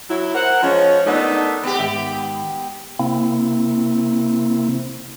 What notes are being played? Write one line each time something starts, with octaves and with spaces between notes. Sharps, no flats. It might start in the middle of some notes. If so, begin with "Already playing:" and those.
F#3 E4
A#4 C5 F#5
F3 G#3 C#4
A3 B3 D4 D#4 A#4
B3 G4
G#2 D#3 E5
C3 A#3 C4 E4